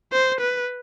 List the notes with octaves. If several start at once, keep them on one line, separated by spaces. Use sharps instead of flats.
C5
B4